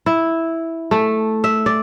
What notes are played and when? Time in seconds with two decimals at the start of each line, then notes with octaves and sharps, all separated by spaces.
0.06 E4
0.91 A3
1.44 E5
1.66 D5